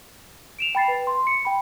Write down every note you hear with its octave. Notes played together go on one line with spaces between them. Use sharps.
D7 E7 F7
G5 B5 A6 C7
B4
C6
C#7
G5 B5